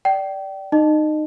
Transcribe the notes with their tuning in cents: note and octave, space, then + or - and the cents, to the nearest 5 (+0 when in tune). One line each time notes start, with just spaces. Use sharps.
D5 +0 G5 -30
D#4 -20 D#5 -30